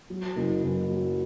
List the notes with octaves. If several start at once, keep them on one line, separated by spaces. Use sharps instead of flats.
F#3
F#1
F#1
F#3